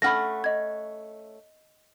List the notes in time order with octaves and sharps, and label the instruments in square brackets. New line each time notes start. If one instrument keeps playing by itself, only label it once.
[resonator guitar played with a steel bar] A3 C#4 F#5 [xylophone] B5 F6 A#6
[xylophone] D#5 G#6